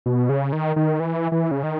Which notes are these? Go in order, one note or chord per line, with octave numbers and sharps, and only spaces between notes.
B2
C#3
D#3
D#3
E3
E3
C#3
D#3